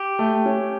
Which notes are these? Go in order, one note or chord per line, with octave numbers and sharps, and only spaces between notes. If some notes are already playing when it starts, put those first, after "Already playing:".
Already playing: G4
A3
C#4